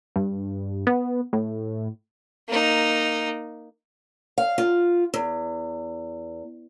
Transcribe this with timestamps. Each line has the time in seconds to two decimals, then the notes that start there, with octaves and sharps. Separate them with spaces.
0.16 G2
0.87 B3
1.33 A2
2.48 A#3 D#4
4.38 F5
4.58 F4
5.14 E2